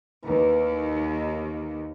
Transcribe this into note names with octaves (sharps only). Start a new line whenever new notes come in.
D#2 E3 A#5